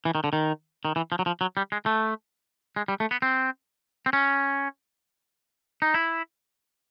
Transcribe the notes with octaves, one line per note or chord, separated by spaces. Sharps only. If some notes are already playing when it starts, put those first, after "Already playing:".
E3
D#3
D3
D#3
D#3
E3
F3
F#3
F3
F#3
G3
G#3
A3
G#3
G3
A3
B3
C4
C4
C#4
D#4
E4